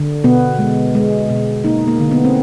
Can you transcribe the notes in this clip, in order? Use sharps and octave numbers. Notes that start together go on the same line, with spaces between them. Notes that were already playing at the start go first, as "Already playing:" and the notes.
Already playing: D3
B2 B3
G#3
G#3
B2
A#3 D#4
A#3
D3
B3
C4